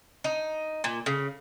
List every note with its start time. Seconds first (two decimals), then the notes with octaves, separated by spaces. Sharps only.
0.24 D#4
0.84 A#2
1.06 C#3